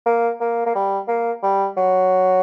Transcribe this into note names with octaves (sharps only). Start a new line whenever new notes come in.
A#3
A#3
A#3
G3
A#3
G3
F#3